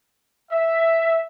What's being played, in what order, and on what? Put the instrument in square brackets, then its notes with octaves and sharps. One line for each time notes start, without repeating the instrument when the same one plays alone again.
[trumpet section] E5